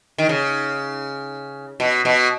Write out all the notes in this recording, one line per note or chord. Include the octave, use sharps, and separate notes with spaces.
D#3
C#3
B2
B2